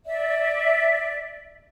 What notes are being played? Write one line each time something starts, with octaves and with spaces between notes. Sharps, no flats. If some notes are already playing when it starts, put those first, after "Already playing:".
D5 E5